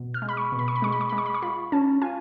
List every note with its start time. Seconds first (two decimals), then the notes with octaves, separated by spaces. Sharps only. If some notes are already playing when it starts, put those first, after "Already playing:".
Already playing: B2
0.14 F6
0.22 G#3
0.29 B5
0.37 C#6
0.52 B2
0.59 B5
0.68 C#6
0.76 B5
0.82 G#3 C#6
0.92 B5
1.01 C#6
1.09 G#3 B5
1.18 C#6
1.26 B5
1.34 C#6
1.42 F4 B5
1.72 C#4 A5
2.02 F4 G#5